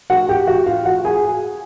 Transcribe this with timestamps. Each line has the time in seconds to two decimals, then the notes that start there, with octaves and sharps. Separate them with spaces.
0.10 F#4 F#5
0.29 G4 G5
0.47 F#4 F#5
0.66 F4 F5
0.86 F#4 F#5
1.05 G#4 G#5